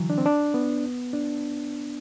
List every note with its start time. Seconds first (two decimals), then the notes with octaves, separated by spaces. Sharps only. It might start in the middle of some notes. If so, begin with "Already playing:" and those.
Already playing: D3 E3 F#3
0.10 D4
0.18 C4
0.26 D4
0.54 B3
1.13 D4